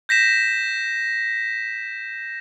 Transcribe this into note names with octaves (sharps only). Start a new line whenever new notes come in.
G6 A#6 B6 E7